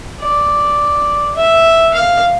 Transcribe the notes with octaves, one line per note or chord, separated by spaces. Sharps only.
D5
E5
F5